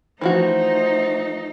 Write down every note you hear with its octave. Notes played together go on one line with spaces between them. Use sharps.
E3 F3 A3 D#4 F#4 C5